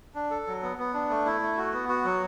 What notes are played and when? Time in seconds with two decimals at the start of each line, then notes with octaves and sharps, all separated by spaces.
0.15 D4
0.30 A4
0.47 F#3
0.63 B3
0.78 B3
0.94 D4
1.10 A3
1.26 E4
1.41 A3
1.57 F#4
1.73 B3
1.89 F#4
2.05 F#3